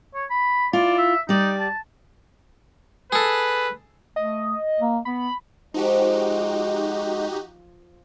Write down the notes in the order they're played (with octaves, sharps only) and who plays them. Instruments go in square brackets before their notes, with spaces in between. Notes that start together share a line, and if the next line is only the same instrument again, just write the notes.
[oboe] C#5
B5
[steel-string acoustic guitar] E4 F4 [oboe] D5
[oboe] E5
[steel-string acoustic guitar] G3 D5 [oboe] D#4
[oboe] A5
[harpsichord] G#4 A4 [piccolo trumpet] B4
[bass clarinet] A3 [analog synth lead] D#5
[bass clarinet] A#3
[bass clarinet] B3 [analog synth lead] B5
[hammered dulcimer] F3 [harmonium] G#3 [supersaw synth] D#4 F#4 G4